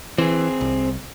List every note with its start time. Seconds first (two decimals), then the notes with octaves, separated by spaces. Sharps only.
0.18 E3 C4 G#4
0.61 C2